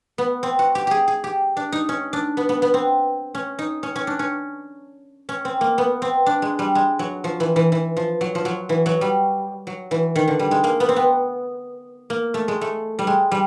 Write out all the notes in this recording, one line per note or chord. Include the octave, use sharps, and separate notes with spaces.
B3
C4
F#4
G4
G4 G#4
G#4
G4
D4
D#4
C#4
D4
B3
B3
B3
C4
C#4
D#4
C#4
C#4
D4
C#4
C#4
C4
A#3
B3
C4
D4
G#3
G3
G#3
F#3
F3
E3
E3
E3
F3
F#3
F3
F#3
E3
F#3
G3
F#3
E3
D#3
D3
G3
G#3
A#3
B3
C4
B3
A#3
A3
G#3
A3
G3
G#3
G3